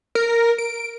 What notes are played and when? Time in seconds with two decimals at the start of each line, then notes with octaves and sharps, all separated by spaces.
0.15 A#4
0.58 D7